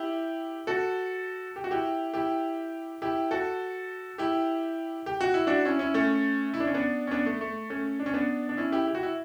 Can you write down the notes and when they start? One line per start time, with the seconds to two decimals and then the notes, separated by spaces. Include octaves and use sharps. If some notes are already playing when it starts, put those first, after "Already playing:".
Already playing: E4 G4
0.67 F#4 A4
1.56 G4
1.64 F#4
1.71 E4 G4
2.14 E4 G4
3.02 E4 G4
3.31 F#4 A4
4.18 E4 G4
5.06 G4
5.21 F#4
5.34 E4
5.47 D4 F#4
5.65 C#4 E4
5.79 C#4 E4
5.94 A3 C#4
6.54 E4
6.60 D4
6.67 C#4
6.74 B3 D4
7.07 C#4
7.11 B3 D4
7.26 A3
7.41 A3
7.70 A3 C#4
8.00 D4
8.06 C#4
8.14 B3 D4
8.49 D4
8.57 C#4 E4
8.72 E4 G4
8.87 G4
8.95 F#4
9.03 E4